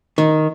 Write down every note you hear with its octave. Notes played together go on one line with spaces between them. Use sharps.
D#3